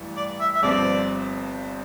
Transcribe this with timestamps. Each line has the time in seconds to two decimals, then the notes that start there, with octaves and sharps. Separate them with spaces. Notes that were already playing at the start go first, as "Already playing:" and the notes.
Already playing: A1 G2 E3
0.16 D5
0.40 E5
0.54 E5
0.62 G1 G2 F3 C4 D5